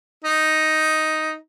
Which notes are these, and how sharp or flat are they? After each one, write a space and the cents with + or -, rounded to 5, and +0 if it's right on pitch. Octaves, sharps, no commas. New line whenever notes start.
D#4 +5